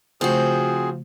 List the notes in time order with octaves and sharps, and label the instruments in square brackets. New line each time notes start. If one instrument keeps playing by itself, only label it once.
[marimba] C#3 A3 [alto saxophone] F3 [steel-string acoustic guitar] C4 F#4 [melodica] G#4